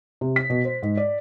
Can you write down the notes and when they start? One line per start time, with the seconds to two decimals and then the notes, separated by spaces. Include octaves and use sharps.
0.21 C3
0.36 B6
0.50 B2
0.65 C5
0.82 G#2
0.97 D5